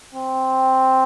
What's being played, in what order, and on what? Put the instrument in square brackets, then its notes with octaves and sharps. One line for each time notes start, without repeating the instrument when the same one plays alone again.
[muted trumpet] C4